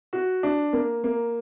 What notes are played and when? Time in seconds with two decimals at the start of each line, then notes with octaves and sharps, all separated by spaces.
0.13 F#4
0.43 D4
0.73 A#3
1.04 A#3